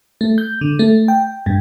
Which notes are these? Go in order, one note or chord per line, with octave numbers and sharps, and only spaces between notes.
A3
G6
D3
A3
G5
G2